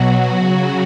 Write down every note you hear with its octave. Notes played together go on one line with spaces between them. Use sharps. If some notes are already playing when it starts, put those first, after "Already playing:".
Already playing: B2 F#3 F#4
C#3 F#3 F#4